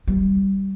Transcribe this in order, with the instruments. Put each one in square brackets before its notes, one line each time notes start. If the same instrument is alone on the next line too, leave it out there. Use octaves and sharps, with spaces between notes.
[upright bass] G3